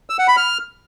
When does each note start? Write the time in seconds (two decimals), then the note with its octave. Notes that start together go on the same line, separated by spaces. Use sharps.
0.10 E6
0.19 F#5
0.28 B5
0.37 F6